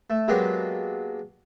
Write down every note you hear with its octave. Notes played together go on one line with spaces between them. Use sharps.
A3
F#3 G#3 A#3 B3 D4 G4